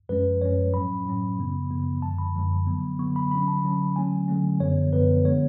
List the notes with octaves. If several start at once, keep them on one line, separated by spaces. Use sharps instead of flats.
F#2 F3 G#3 C#4 B4
F#2 F3 G#3 C#4 C#5
A2 F#3 C#4 B5
A2 F#3 C#4
F#2 C#3 F3 B3
F#2 C#3 F3 B3
F#2 D3 F3 G#3 A5
B5
F#2 D3 F3 G#3
D3 F#3 B3
D3 F#3 B3 C#6
B5
D3 F#3 C#4 B5
A5
D3 F#3 C#4
D3 F#3 A3 C#4 G#5
D3 F#3 A3 C#4
F#2 D3 F3 B3 C#5
F#2 D3 F3 B3 B4
D3 G#3 B3 C#5